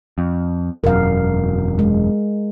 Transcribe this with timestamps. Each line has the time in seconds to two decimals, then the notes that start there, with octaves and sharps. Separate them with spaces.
0.18 F2
0.84 E1 F#2 A#4 F5
1.79 G#3